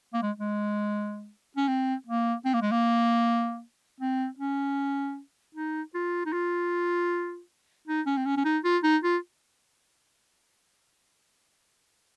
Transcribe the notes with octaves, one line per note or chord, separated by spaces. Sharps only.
A#3
G#3
G#3
C#4
C4
A#3
C4
A#3
G#3
A#3
C4
C#4
D#4
F4
D#4
F4
D#4
C#4
C4
C#4
C#4
D#4
F4
D#4
F4